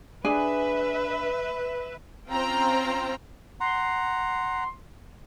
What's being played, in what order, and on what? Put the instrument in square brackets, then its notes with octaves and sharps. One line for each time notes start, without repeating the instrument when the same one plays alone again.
[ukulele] D4 G#4 G#5 [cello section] B4 E5
[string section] C4 C#4 F4 C5 G5 A#5
[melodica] F#5 A#5 [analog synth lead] C6